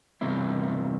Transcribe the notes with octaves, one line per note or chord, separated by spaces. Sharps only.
E2 G2 C3 G#3 C4 E4